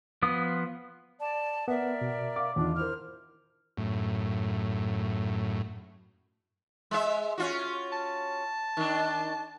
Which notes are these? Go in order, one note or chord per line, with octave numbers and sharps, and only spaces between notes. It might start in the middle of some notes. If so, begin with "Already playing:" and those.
F3 B3 D#6
D5 A5
B3 A#4 D5 E5
B2
F5 D6
E2 D4 D#4 F4
E4 A#4 C5 F6
F#2 A2
G#3 E5
C#4 F4 F#4
A5
D#3 D4